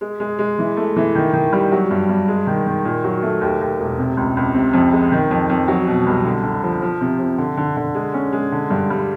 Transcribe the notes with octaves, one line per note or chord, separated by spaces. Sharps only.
G#3
G#3
G#3
E3
A3
E3
D#3
D#3
G3
F#3
G2
G2
G#3
D#3
D#3
A#2
F#3
A3
D#2
D#2
E1
C3
C#2
C#2
C3
F2
G#3
D#3
F2
F2
F#3
B2
C2
D3
D3
F3
F3
C3
F3
D3
D3
D3
G#3
C#4
G#3
D3
G2
G3